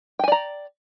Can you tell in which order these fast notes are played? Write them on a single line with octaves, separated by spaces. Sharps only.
G5 G#5 D5 A#5